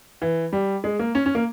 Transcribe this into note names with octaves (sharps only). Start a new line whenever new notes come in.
E3
G3
G#3
A#3
C#4
C#4
A#3